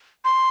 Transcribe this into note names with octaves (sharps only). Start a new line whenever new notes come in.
C6